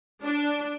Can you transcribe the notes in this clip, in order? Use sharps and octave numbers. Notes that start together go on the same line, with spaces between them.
D4